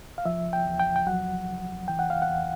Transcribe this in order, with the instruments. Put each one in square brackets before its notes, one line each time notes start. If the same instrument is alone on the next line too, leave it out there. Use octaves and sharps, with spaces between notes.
[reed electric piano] F5
F3 E5
G5
E2
G5
G5
F#3 F#5
C#2
E3 G5
F#5
F5
F#5
E2